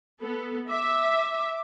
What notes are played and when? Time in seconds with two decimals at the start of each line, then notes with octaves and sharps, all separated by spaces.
0.21 B3 A4
0.68 E5 D6